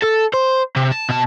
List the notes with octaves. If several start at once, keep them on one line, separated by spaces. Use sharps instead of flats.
A4
C5
C3
A5
B2 A5